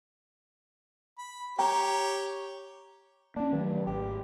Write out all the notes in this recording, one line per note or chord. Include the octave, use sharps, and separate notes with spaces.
B5
G4 C#5 G5 A#5
A#3 C#4 D4
G2 D#3 F#3 A3
G#1 G4